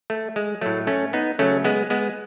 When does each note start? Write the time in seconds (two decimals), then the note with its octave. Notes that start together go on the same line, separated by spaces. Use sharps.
0.10 A3
0.36 G#3
0.61 A2 F#3 A3
0.87 A3 C#4
1.13 B3 D#4
1.39 C#3 F#3 A3 C#4
1.64 G#3 B3
1.90 G#3 B3